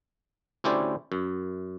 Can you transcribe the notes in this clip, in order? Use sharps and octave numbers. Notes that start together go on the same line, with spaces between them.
D2 C#4 E4 G4 C5 D5
F#2